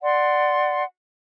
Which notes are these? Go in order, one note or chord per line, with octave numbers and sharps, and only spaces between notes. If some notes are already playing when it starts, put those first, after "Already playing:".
D5 F#5 C6